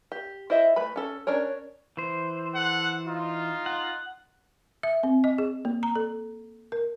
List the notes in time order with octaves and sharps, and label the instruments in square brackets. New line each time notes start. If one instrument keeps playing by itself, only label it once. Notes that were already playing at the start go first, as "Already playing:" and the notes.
[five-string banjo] G4
E4 C5 D#5 E5
A3 B4 B5
C#4 A4
C#4 D4 A#4 C#5
[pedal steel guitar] E3 C5
[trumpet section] A4 F#5
D#4 F4
[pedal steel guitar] F#5
[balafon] E5
C4
D#5
G#4
A#3
A#5
A4
A#4